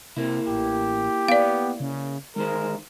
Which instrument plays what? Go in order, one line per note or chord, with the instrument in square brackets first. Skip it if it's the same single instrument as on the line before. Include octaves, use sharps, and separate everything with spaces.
[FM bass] C3 [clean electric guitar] A#3 E4
[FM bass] A1 [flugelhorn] G4
[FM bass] B3 [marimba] D5 F5
[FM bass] C#3
[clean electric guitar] D2 D#3 C5 [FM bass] G#3 [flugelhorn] A#4